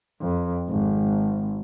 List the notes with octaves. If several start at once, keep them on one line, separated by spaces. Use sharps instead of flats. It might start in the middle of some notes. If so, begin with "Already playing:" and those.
F2
G#1